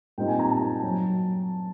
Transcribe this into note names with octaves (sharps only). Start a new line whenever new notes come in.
A#2 G3 C4 D#4 G5
G#5
A#5
A5
F#3